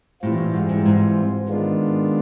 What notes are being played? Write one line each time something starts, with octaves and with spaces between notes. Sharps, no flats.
A2 E3 G3 C4 F4
A2
G#2
G#2
G#2
D#3 G#3 B3 D4 F4